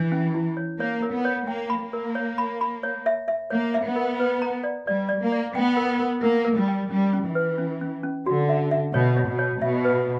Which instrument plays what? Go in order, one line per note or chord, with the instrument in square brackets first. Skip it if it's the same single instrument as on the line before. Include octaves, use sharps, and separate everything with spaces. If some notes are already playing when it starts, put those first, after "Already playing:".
Already playing: [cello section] E3 [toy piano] D4
[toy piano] C#4
E4
C#5
[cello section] A#3 [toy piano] C#5
[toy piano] A#4
[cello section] B3
[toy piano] C#5
[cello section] A#3 [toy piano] G5
[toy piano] B5
[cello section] A#3
[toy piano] A#4
C#5
B5
B5
C#5
E5
E5
[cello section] A#3 [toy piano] C#5
[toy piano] E5
[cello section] B3
[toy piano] A#4
B4
A#5
D5
[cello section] G3 [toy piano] D5
[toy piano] D5
[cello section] A#3
[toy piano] D5
[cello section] B3 [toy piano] G5
[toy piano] A#4
A#4
[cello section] A#3 [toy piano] A#4
[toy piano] A#4
[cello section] G3
[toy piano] G5
[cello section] G3 [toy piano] C#4
[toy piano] C#4
[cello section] E3
[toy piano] B4
C#4
C#4
C#4
[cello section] D3 [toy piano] F#4
[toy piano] E5
E5
[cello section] B2 [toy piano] C#5
[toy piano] C#5
[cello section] B2
[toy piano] C#5
[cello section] B2 [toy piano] E5
[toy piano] B4